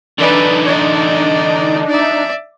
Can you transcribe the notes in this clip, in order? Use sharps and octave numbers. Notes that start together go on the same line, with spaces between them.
D3 E3 D4 D#4 B4 D5
D5 D#5
D5 E5